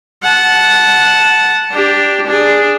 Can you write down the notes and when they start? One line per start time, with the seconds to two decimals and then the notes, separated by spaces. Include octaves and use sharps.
0.23 F#5 A5
1.72 D4 G4
2.27 D4 G#4